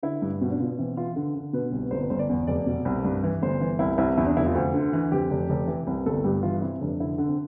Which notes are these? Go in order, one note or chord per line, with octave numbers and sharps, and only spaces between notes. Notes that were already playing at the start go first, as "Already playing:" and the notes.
D3 E4
G2
B2 C4
D4
B2 F4
B3
E3 C4
E3 F4
D3
D3
B2 B4
C2
G1 C5
B4
G1 C5
D5
E2
F1 D5
B2
C2
G2
E3
G1 C5
E3
C2 E4
C2 E4
E2 E4
D4
F1 E4
F4
D2
D3
E3 B4
F2 G4
F1
F1
E3
C2
G1 A4
G2 G4
E3 F4
C3 E4
F1 D4
D3 E4
D3
C4